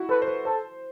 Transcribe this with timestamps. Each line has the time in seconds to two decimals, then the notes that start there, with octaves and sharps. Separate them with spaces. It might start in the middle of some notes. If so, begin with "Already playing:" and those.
Already playing: E4 F#4
0.09 A4 B4
0.22 C5
0.28 B4
0.45 A4 C5